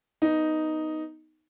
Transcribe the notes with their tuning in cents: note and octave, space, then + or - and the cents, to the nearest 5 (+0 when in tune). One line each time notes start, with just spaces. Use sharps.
B3 +0 D#4 +0